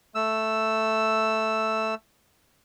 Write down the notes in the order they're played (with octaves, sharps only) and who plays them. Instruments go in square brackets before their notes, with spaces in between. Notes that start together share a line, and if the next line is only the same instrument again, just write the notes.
[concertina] A3 E6